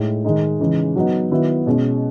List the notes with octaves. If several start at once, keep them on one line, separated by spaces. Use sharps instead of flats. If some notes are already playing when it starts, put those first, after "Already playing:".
Already playing: A2 G#3 D#4
D#3 G#3 D#4
C#3 E3 G#3 D#4
F#3 B3 D#4
D#3 F#3 B3 E4
B2 G#3 C#4